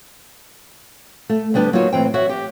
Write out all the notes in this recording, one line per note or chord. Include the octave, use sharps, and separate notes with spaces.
A3
D2 G3 B3 D4 G4
F#3 A#3 D#4 F4 F#4 C#5
A2 E3 C4 G5
F#4 C#5 E5 F#5
G4